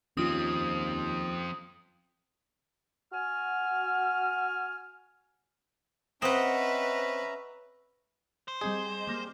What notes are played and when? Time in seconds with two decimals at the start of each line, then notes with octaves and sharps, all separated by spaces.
0.17 D#2 F3 C4 C#4 F4 D#6
3.13 F#4 G#5 F6
6.22 C4 C#4 B4 D#5 E5 F#5 A#5
8.48 C5
8.61 G3 C4 G#4 D#5
9.07 G3 A#3